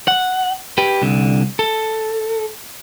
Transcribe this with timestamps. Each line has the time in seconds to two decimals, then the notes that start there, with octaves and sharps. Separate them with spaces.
0.08 F#5
0.78 G4 B4
1.02 C2 D3
1.59 A4